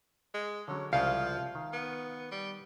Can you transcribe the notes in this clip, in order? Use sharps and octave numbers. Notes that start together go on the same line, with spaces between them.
G#3
D3 F#3 C#4
C2 C#3 F3 G#3 F5
D#3
B3
G3